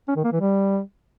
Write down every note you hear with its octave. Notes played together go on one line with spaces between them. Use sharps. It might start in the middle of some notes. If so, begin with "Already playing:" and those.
C#4
D#3
A#3
E3
G3